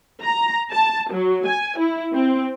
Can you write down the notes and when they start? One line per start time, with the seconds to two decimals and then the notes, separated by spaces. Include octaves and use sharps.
0.23 A#5
0.72 A5
1.12 F#3
1.46 G#5
1.78 E4
2.14 C4